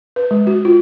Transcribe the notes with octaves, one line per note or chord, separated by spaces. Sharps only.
B4
G#3
F#4
F4